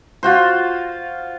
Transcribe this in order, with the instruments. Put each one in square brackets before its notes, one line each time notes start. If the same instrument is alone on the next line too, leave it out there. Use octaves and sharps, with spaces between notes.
[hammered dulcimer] F4 F#4 C5